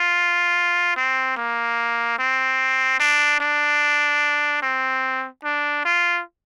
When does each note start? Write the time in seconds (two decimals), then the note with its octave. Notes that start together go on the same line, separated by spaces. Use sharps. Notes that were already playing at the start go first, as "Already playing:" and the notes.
Already playing: F4
0.96 C4
1.36 A#3
2.19 C4
3.00 D4
3.41 D4
4.62 C4
5.44 D4
5.85 F4